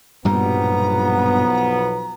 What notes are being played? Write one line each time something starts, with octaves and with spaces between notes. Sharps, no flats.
B1 G2 A#2 F3 G3 B3 A#5